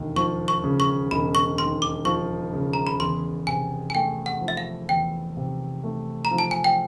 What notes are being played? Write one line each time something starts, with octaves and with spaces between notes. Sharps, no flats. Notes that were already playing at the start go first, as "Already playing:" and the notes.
Already playing: E1 D#2
F3 C#6
C#6
C#3
C#6
E1 B5
C#6
D#2 C6
D6
F3 C#6
C#3
A#5
B5
E2 C6
C3 G#5
G#5
A3 G5
F#5
F3
E5
F5
E2 G5
C3
A3
A#5
F3
A5
G#5
G5